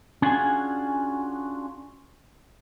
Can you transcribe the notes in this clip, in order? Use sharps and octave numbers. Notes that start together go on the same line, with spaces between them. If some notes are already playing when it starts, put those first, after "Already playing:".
C#4 D4 F4 F#4 G#4 G#5